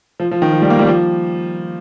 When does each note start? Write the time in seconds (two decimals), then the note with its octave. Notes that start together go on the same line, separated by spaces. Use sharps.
0.20 F3
0.31 F3
0.42 D#3
0.53 F3
0.62 G3
0.70 A#3
0.79 G3
0.87 F3